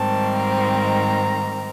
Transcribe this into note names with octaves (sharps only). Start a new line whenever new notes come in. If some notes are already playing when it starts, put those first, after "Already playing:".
Already playing: G#2 D#3 G3 C4 A5
A#5